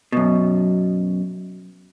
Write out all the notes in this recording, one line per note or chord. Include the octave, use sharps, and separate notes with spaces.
F#2 B2